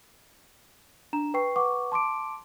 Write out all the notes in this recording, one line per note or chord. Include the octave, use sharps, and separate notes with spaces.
D4 A#5 E7
B4 G5 C#6 C7
B4 F#5 C#6 D6
A5 C6 D6 D7